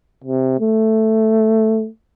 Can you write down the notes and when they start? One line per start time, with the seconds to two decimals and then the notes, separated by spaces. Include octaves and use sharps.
0.24 C3
0.60 A3